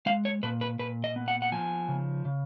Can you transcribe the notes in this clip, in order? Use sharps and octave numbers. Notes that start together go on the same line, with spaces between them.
G#3 F5
C#5
A#2 B4
B4
A#2 B4
D#5
B3
F#5
F#5
F3 G#5
C#3
C#3